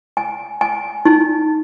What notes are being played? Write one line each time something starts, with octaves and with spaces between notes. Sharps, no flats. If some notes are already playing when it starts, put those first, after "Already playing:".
G#5
G#5
D#4